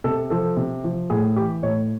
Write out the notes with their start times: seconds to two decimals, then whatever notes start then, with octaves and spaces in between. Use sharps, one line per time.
0.04 C3 A4
0.30 F3 A4
0.57 C3
0.84 F3
1.10 A2 G#4
1.36 E3 G4
1.63 A2 C#5